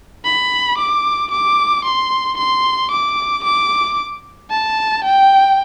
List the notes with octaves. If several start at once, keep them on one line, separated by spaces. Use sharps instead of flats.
B5
D6
D6
C6
C6
D6
D6
A5
G5